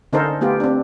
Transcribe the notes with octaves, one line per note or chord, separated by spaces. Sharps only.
D3 C#4 D#4 A4 A#4 C5
A3 B3 F4 G4
C4 D4